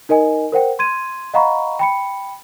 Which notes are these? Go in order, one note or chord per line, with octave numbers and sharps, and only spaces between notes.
D#4 A#4 D#5 G#5
A#4 C5 F#5 G5
C6 G#6 D#7
D#5 F5 F#5 A#5 B5 C#6
G5 B5 C#7